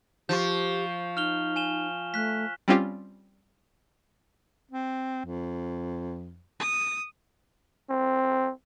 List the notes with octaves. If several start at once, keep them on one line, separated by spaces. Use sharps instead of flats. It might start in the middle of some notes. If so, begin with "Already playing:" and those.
F3 G4 C#6 G6
D#4 F6 F7 G7
G#5 E7 G7
A3 F#6 B6
G3 C4 C#4 F4 G4
C4
F2
D#6
C4